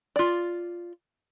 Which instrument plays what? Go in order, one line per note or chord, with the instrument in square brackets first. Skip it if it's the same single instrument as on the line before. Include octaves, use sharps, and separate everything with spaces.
[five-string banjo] F4 D5